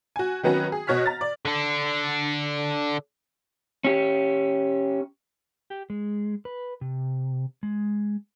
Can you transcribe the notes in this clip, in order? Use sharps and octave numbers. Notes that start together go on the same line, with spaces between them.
F#4 G#5
D#3 F#3 B3 C#4 F#4
G#4
B2 F#4 C#5 F6 B6
A#5 A6
D5
D3 D4
C#4 G4
G4
G#3
B4
C3
G#3